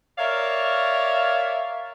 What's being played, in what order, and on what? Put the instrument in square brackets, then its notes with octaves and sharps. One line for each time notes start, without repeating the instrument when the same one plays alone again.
[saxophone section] A#4 C#5 D5 E5 F5